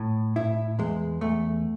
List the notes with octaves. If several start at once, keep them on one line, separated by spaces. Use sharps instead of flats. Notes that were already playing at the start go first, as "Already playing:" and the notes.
Already playing: A2
A2 E4
E2 G#3
E2 A3